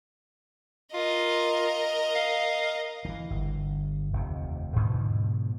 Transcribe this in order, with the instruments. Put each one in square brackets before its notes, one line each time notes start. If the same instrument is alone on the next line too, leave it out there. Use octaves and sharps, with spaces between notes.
[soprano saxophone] F4 [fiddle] A#4 D#5
[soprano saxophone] F5
[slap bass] D#3 E3
G1
F1 D#2 C3
G#2 B2 D3 F3